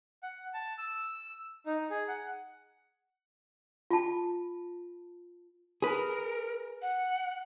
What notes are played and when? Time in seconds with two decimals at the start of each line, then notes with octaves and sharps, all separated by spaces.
0.23 F#5
0.54 A5
0.78 E6
1.66 D#4
1.90 G#4
2.08 F#5
3.90 F4 A5
5.82 G#4 A#4 B4
6.82 F#5